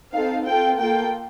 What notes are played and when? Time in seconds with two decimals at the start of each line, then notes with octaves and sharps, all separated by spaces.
0.12 C4 D#4 A4 F5
0.45 C4 F4 A4 G5
0.77 A#3 F4 A4 G5